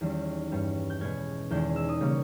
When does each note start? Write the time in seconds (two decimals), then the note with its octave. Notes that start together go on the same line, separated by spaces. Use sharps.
0.01 E2 D#3 G3 C#4
0.51 G2 G3 C#4
0.90 G6
1.01 B2 G#3 C#4 G#6
1.50 E2 D#3 G#3 G6
1.76 E6
1.89 D#6
2.01 C#3 G3 A#3 C#4